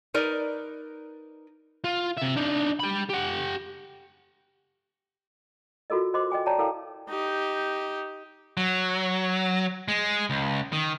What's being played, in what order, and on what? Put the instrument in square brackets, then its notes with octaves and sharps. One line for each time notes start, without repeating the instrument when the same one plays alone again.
[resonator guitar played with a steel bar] D#4 A#4 B4 D5
[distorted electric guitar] F4
C3 E5
D4 D#4
G4 B5
G4 F#5
[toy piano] F4 F#4 A4 A#4 D#5
F#4 C5 D#5 C6 D6
D#5 G5 G#5 D6
C#5 D5 E5 G5 A5 A#5
E4 A4 A#4 F5 G5
[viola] D#4 G4
[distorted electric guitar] F#3
G#3
C#2
D#3